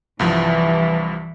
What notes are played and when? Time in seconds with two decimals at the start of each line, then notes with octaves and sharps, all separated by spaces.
0.19 C2 G2 E3 F3